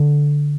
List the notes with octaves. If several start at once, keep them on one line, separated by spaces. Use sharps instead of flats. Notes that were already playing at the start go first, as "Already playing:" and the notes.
Already playing: D3